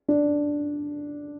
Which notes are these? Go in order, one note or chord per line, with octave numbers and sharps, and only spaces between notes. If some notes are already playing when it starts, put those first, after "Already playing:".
D4